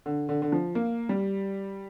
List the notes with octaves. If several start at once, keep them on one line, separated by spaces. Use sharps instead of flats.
D3
D3
D3
F3
A#3
G3